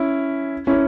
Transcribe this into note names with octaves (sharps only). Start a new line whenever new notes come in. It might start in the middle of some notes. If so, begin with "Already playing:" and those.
Already playing: C#4 E4
C#4 E4